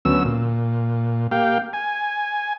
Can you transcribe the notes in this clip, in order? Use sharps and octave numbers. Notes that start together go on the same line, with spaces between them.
D2 F#3 B3 C#4 E6
A#2
A#3 G4 F5 G5
G#5